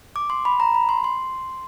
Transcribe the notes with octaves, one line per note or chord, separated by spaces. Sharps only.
D6
C6
B5
A#5
B5
C6
C6